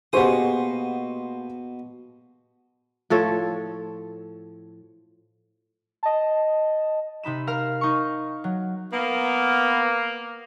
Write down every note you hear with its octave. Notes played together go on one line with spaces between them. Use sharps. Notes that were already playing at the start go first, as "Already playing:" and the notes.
B2 A#3 G4 G#4 C5 F#5 C#6 D#6
A2 F3 A4 C#5
D#5 A5
C3 D#4 B5 E7
A#4 F5 A#5 F6
D#4 C#6
F#3
A#3 B3